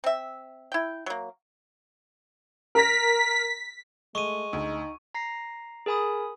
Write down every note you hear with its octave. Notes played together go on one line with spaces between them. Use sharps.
C4 E5
E4 G5
F#3 A#3
A#4 A#5 A#6 B6
G#3 A3 C#6 D#7
D2 D#4
A#5 A#6 C7
G#4 A#4 G#5 B5 D#6